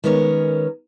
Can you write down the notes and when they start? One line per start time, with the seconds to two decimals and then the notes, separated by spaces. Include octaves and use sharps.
0.04 D#3 G#3 B3 C#4 A#4 C#5